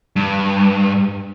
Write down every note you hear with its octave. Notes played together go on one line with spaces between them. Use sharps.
G2